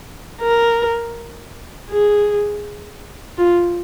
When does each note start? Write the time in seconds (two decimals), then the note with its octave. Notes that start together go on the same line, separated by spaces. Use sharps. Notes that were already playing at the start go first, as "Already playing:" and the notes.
0.41 A#4
1.90 G#4
3.37 F4